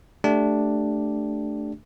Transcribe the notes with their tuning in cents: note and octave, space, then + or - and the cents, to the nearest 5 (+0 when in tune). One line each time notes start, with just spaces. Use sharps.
A3 +0 D4 +0 G4 -5